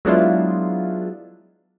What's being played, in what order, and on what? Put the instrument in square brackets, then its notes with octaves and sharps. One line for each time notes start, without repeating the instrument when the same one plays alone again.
[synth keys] F#3 G#3 B3 D4 E4 F4